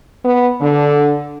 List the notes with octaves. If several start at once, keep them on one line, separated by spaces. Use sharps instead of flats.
B3
D3